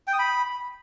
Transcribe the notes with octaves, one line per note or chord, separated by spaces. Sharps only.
G5
D#6
B5